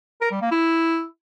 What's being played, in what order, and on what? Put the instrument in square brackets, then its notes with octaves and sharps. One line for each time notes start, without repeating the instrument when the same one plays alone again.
[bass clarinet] A#4
G3
A#3
E4